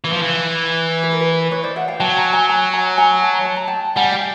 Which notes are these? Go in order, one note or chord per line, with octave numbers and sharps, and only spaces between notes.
E3 B4
F3
E3
B4
A#4
B4
B4 C#5
C5 D5
E5 F#5
F5 G5
F#3 G5 A5
G#5 A#5
G#5 A#5
G#5 A#5
G#5 A#5
G#5 A#5
A5
A#5
A5
A#5
G5 A5
G3 F#5 G#5
F5 G5